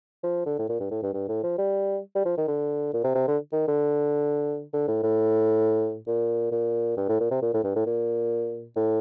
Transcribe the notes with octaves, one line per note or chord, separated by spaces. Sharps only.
F3
D3
A2
A#2
G2
A2
G2
G2
A2
F3
G3
G3
F3
D#3
D3
A#2
C3
C3
D3
D#3
D3
D3
A2
A2
A#2
A#2
G2
A2
A#2
C3
A#2
A2
G2
A2
A#2
A2